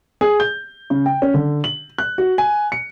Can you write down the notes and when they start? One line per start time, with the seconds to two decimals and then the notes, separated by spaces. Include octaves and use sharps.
0.21 G#4
0.40 G6
0.90 C#3
1.06 G5
1.22 C#4
1.34 D3
1.64 F#7
1.98 F#6
2.18 F#4
2.38 G#5
2.72 C#7